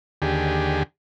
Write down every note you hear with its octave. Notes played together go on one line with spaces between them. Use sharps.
D#2 D3 G4 G#4